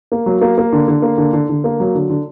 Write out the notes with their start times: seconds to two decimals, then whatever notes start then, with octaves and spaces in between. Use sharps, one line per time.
0.12 A#3
0.26 F#3
0.41 A#3
0.58 A#3
0.73 D3
0.88 D3
1.02 A#3
1.18 D3
1.33 D3
1.49 D3
1.64 A#3
1.80 F#3
1.95 D3
2.10 D3